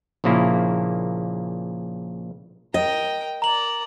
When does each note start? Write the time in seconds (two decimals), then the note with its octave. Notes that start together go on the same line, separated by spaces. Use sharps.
0.24 A#1 A#2 C#3 A#3 E4
2.74 A#4 D#5 G5
3.42 A#4 D5 A#5 F#7